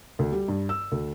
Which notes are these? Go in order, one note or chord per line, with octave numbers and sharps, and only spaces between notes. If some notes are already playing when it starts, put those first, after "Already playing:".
D2
G3
G2
E6
D2